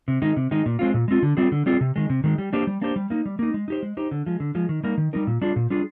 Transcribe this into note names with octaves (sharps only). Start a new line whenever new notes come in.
C3
D#3 G#3 D#4
C3
D#3 G#3 D#4
A#2
G#3 C4 F4
A#2
G#3 C4 F4
D3
G3 C4 F4 G#4
D3
G3 C4 F4 G#4
C3
D#3 G#3
C3
D#3 G#3
G3
A#3 D4 G4 C5
G3
A#3 D4 G4 C5
G3
A#3 D#4
G3
A#3 D#4
G#3
D#4 G4 C5
G#3
D#4 G4 C5
D3
F3 G#3
D3
F3 G#3
D#3
G3 A#3 D#4 A#4
D#3
G3 A#3 D#4 A#4
A#2
G3 D4 F4 G#4
A#2
G3 D4 F4 G#4